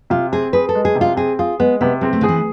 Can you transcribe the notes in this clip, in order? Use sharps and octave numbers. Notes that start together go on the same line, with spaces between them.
C3 F4
C4 G#4
G#4 B4
A4
G#3
G#4
C3
F4
C4 G#4
F4 G#4
G#3 B3
C3 B3
G#3 C4
A3
D3 G#4
E3